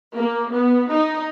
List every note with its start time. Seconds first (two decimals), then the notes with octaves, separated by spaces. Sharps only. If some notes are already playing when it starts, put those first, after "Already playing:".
0.16 A#3
0.52 B3
0.92 D#4